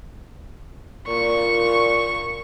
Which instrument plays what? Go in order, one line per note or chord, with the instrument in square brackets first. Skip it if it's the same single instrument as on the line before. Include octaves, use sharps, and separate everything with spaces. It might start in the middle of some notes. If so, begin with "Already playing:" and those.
[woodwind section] A#2 [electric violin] C#6